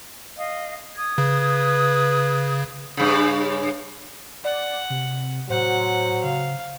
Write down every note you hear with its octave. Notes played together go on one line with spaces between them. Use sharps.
D#5 F5
D#6 G#6
C#3 B4
G2 C#3
D5 F#5
C3
A2 F#3 C5 F#5
C#3 F5